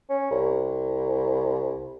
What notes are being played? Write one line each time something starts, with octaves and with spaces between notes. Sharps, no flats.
C#4
C2